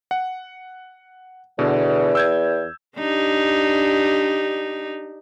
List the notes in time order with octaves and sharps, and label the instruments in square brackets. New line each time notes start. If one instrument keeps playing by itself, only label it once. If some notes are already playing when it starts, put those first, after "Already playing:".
[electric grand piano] F#5
[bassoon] E2 [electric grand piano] B2 D3
[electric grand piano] E6 G6 G#6
[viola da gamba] D4 D#4 G4